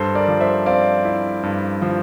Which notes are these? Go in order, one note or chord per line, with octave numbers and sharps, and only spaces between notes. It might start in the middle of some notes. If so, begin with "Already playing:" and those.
Already playing: G2 A4 C5
A#4 D5
F3
C5 E5
C4 D5 F5
E4
G2
F3